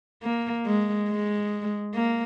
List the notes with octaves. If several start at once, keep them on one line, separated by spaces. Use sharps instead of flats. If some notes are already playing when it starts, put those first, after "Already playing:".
A#3
G#3
G#3
A#3